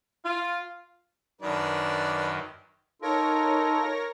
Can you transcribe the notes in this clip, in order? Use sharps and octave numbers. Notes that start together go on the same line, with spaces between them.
F4
F#2 D#3 D4 B4 D5
D#4 F4 A4 A#4 C#5 A#6